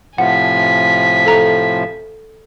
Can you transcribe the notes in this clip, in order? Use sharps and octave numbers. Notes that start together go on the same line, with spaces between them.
A2 C3 F3 F#5 G#5 B6
A4 A#5